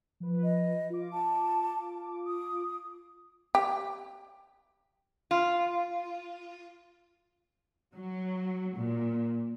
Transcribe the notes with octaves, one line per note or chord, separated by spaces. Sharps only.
F3 B4
D#5
F4 D6
A5
D#6
G4
F4
F#3
A#2